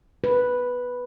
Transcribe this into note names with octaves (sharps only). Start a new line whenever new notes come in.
B4